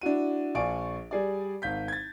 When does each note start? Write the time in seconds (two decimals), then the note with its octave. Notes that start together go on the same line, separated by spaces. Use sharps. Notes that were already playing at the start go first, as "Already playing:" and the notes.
0.01 D4 E4 F#4 D#7
0.55 A#1 D5 F5 G#5 C#6 D7
1.11 G3 G#4 D5
1.62 G#1 F5 G6 B6
1.88 G#6 A6